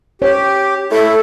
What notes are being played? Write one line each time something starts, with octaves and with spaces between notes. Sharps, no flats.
G4 C#5
A3 E4 A4